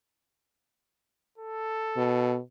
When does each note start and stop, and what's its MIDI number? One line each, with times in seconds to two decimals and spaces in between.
1.38 2.38 69
1.97 2.39 47